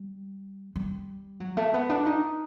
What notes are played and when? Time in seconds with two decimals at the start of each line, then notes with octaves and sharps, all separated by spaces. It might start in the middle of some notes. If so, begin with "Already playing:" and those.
Already playing: G3
0.76 G3
1.40 F#3
1.57 A3
1.74 B3
1.89 D4
2.06 D#4